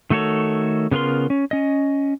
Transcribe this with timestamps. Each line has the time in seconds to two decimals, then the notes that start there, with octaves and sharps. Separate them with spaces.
0.10 D#3 A3 F#4 A4 C#5
0.91 C#3 B3 F4 A#4 C6
1.30 C#4
1.51 C#4 D#5